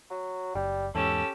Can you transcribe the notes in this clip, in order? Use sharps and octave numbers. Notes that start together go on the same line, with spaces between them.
F#3
F#1 G3
E2 G#2 C#4 G4 A4 E6